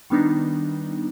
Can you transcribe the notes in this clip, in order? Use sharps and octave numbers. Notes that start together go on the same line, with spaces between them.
D#3 G3 B3 D4 D#4